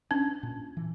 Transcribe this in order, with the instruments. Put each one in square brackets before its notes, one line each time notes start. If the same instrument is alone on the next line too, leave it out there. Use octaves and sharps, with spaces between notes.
[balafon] C#4 [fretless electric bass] D4
[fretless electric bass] A#2
E3